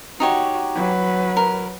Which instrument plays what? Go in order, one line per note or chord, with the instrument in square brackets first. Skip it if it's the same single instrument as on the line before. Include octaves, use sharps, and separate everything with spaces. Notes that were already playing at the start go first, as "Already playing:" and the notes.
[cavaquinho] D#4 G4 C#5 [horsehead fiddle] F#4
[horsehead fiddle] F#3 B4
[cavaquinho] A#4